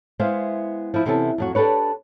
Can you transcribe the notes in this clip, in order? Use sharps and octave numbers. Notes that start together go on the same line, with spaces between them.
G#3 B3 E4 C5 F5
F3 E4
C3 E3 B3 C#4 E4 A4
F2 F#3 F#4
D4 G4 A4 B4 C#5